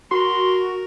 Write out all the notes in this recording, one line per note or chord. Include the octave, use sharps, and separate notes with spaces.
F#4 A#4 C6